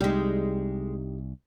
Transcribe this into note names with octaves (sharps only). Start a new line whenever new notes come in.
C2 G3 G#3 D#4 G4